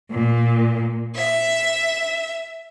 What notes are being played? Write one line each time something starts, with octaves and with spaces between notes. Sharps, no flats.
A#2
E5